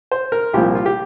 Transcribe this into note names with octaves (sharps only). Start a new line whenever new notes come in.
C5
A#4
C2 A#2 F3 G4
F4
G4